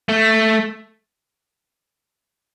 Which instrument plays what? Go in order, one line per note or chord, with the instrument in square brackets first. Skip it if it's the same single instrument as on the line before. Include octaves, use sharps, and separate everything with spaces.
[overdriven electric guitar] A3